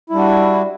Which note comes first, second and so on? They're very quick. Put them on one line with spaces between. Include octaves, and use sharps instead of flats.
E4 G3 D4 F#4